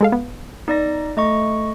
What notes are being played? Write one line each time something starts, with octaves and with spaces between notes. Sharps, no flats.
G#3 A4 F5
B3
B3 D#4 D5 A#6
A3 D#5 C#6